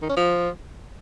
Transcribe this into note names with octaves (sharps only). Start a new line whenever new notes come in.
D#3
C#4
F3